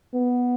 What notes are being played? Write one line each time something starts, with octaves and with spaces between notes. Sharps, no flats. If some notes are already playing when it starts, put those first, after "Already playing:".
B3